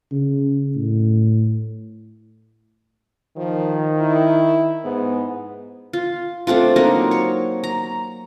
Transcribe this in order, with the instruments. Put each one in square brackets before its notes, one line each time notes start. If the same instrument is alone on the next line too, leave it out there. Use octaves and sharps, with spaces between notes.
[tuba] C#3
A2
[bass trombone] D#3 [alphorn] F3
[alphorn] E4
[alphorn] G#2 [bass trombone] B3
[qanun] F4
A3 C4 D4 F4
F#3 A#3 D#4 A#4
C#5
A#5